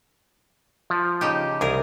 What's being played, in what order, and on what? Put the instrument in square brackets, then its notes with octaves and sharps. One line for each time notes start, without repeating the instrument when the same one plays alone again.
[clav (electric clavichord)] F3
[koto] C#3 D#4 G4
[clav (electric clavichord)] C2 [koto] G#4 A#4